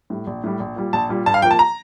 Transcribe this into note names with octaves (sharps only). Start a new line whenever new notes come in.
A2 G3
A#1
A2 G3
A#1
A#2 G3
A#1 A5
A#2 G3
G2 A5
F5
F3 A#3 G5
A5
A#5